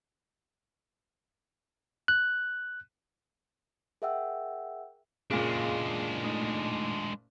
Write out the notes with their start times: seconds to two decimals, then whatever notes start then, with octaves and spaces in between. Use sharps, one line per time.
2.08 F#6
4.02 G#4 A#4 E5 F#5 G5 E6
5.31 F#1 A#2 G#3 D4 G#4 F5 G#5
6.24 A3 D#4